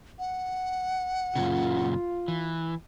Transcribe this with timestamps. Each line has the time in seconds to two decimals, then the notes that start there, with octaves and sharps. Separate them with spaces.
0.19 F#5
1.36 F#2 A#2 C#3 F4
2.28 E3